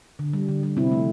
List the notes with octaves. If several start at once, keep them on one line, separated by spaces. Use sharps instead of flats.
D3
G3
D3
G3
C3 C4 E4
F3 A3